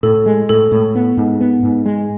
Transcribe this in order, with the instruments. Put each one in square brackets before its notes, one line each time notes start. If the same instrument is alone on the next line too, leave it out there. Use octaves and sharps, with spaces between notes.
[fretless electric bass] A2 [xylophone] A4
[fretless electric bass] G#3
[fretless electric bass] A2 [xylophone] A4
[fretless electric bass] A2
B3
G#2
B3
G#2
G#3